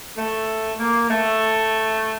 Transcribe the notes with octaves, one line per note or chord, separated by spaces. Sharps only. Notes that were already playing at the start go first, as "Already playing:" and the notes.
A3
A#3
A3